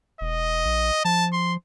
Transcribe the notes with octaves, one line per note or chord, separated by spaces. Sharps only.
E1 D#5
A#1
F3 A5
C6